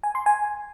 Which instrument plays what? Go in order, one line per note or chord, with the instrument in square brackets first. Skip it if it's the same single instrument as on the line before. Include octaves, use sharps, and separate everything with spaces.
[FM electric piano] G#5
C6
G#5